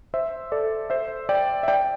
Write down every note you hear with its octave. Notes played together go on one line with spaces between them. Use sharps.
C5 E5
A4 D5
C5 E5
D5 G5
E5
D5 G5